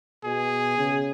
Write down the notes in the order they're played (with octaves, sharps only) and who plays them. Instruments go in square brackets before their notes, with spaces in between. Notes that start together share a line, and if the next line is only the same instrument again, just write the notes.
[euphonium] B2 [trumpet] G#4
[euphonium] C#3